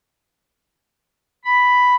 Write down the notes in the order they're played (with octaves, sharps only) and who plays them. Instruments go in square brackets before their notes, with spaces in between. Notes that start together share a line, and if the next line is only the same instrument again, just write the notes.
[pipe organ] B5